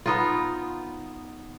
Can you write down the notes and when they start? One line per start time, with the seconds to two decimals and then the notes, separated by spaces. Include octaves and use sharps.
0.06 B3 D#4 F4